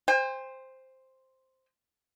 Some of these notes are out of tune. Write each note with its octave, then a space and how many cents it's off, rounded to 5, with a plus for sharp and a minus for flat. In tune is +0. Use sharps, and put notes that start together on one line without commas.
C5 +0 G5 +45